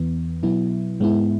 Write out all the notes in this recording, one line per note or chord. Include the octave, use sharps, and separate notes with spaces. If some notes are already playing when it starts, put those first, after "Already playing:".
Already playing: E2 E3 B3
B2 F#3 B3 E4
G#2 G#3 B3 E4